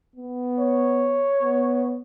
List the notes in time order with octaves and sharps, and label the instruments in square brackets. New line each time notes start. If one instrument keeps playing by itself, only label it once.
[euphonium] B3
[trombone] C#5
[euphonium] B3